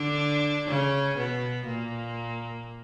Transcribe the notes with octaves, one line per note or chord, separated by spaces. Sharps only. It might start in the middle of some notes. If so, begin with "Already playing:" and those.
Already playing: D3 D4
C#3 C#4
B2 B3
A#2 A#3